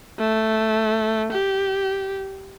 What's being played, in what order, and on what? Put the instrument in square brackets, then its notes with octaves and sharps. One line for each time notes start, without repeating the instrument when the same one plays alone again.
[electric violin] A3
G4